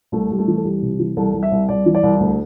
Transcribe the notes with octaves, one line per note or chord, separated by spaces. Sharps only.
C2 A3
C2 G3
A3
E3
A4
C2 G4
C3
E3
C2 A4
C2
E5
C2
C2 D5
E3
D5
C2
D2